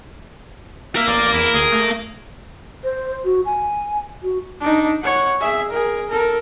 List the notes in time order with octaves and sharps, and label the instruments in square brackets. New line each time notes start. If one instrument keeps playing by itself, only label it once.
[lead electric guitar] A#4 F5 [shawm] E5
[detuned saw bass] A1 [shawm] D5
[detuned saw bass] E2 [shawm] E4
[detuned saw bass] D2 [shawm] G#4
[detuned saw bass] A3
[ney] C5
F#4
G#5
F#4
[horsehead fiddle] D4 D#4
C#5 F#5
G#4 E5
G#4 A#4
A4 A#4